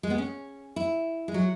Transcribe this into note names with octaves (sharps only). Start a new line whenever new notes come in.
G#3
B3
C#4
E4
G#3
F#3